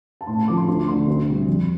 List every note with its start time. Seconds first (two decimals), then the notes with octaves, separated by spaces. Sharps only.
0.21 A5
0.27 A2 C6
0.38 A5
0.47 F3 A3 D6
0.57 C6
0.68 D2 C6
0.88 D3 A3 C6
1.08 D2
1.28 C3 G3
1.47 F2